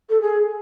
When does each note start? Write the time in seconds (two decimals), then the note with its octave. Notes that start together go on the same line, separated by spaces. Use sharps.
0.10 A4
0.21 G#4